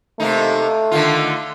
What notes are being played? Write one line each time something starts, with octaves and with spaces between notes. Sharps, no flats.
C3 A3 A#3 D#4
D3 D#3 F4